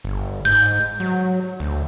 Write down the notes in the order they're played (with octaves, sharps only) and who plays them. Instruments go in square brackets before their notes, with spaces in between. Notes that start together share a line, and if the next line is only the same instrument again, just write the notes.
[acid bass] G1
[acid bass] G#2 [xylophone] G6
[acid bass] F#3
D2